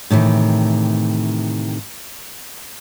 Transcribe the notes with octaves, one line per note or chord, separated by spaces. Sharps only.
A2 C3 D#3 E3